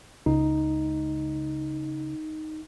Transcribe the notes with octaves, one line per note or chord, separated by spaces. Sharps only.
C#2 D#4